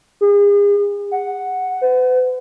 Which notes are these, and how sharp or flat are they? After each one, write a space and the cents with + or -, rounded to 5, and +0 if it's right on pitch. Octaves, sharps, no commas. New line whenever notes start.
G#4 -40
F#5 +0
B4 +45